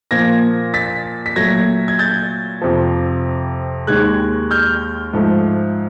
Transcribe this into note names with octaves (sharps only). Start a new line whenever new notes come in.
A#2 F3 A#3 G#6 A#6
A6 B6
B6
A#2 F#3 A3 G#6 A#6
G#6
G6 A6
F2 C3 F3
D#2 D#3 G#3 F#6 G#6
F6 G6
G#2 F3 A3